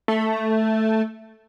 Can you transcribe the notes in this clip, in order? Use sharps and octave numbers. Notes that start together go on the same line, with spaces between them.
A3